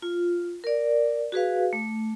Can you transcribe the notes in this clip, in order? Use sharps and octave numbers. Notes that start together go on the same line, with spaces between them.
F4
A#4 D5
F#4 G#4 B4 F5
A3